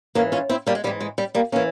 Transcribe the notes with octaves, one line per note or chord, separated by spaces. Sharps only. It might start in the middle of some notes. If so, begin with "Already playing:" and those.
G#2 E3 A#3 C#4
C#4 F4
C4 E4
G3 A#3
G#3
G#2 E3 G3
G#3
G3
G3 A#3
E3 A#3 C#4